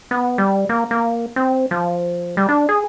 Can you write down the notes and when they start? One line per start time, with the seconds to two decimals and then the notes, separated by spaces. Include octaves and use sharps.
0.11 B3
0.38 G3
0.69 A#3
0.91 A#3
1.36 C4
1.71 F3
2.37 G3
2.49 D4
2.69 G#4